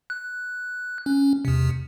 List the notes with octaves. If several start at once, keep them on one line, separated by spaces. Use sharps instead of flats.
F#6
C#4
E2 C3